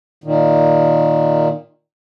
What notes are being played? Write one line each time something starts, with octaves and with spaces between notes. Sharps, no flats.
A#2 D#3